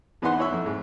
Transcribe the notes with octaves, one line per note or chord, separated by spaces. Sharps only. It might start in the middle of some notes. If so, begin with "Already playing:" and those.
E2 B3 D#4 B4 F#5 C6
E4 C#5 E5
F2
G#2